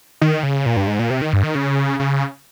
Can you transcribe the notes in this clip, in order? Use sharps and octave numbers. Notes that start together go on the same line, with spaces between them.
D#3
C#3
A#2
G2
G#2
A#2
C3
D#3
G2
D#3
C#3
C#3